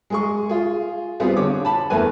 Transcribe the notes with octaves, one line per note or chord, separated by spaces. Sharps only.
G#3 G#4 C#6
F4 G#4
G3 B3 C4 F4 G#4
D3 C#5 D6
A5 B5
E2 A3 A#4 B4 G#5